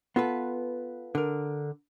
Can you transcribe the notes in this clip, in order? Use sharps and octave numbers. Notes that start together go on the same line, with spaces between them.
B3 F4 A4 B4
D3 A#4